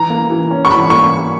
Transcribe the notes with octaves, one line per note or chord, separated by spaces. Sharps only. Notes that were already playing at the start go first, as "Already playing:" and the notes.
Already playing: E3 A#5
A#3
E3
C#4
C#6
E3 B5
A#3 C#6